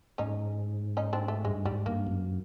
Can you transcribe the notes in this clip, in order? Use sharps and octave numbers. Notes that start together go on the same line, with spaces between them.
G#2 C#4 D#4
C#4 D#4
C4 D4
A3
G2 G#3
G#2 G3
G2 A#3
F#2